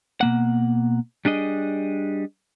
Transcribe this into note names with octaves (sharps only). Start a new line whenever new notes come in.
B2 A#3 F#5
G3 D4 G#4 D#5